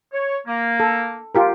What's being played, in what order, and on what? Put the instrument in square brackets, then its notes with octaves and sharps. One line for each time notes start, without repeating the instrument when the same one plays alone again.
[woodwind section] C#5
A#3
[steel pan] A4
F4 G4 A#4